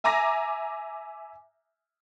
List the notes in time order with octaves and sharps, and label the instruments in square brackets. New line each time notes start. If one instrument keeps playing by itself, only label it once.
[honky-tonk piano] E5 G#5 A#5 D6 A#6